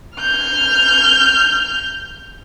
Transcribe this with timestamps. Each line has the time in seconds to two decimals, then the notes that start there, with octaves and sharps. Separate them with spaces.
0.19 F6 G6